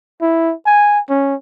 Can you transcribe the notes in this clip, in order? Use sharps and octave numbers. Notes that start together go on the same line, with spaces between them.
E4
G#5
C#4